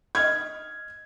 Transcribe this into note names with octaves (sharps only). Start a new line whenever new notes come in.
D#5 F6 G#6